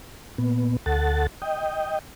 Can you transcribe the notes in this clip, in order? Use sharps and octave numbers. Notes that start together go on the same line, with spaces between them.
A#2 B3
D2 A4 F#5 A6
D#5 G5